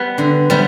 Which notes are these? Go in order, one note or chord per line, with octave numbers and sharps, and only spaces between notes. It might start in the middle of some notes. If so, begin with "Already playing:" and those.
Already playing: G3 B3 B4
D3
G3 B3